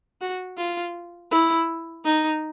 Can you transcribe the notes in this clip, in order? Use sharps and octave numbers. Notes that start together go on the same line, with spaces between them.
F#4
F4
E4
D#4